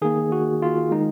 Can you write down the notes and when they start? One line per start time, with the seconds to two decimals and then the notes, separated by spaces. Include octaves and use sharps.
0.02 D#3 A#3 G#4
0.32 F#4
0.62 F4
0.91 D#3 G#3 D#4